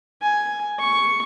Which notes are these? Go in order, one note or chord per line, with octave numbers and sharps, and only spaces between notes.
G#5
C#6